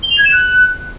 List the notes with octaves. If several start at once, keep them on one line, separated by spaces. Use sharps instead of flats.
G7
F7
G#6
E7
F#6